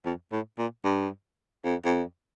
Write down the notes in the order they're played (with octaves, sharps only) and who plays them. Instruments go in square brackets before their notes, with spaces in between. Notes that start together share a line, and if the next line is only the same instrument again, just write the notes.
[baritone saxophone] F2
A2
A#2
G2
F2
F2